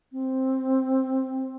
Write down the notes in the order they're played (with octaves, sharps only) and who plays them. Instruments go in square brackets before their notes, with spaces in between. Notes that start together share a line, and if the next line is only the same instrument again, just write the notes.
[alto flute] C4